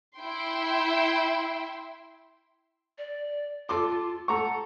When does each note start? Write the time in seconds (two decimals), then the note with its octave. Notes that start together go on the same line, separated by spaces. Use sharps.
0.18 E4 E5 G5 C6
2.98 D5
3.69 F4 A4 C6 D6
4.28 A4 F#5 A#5 C#6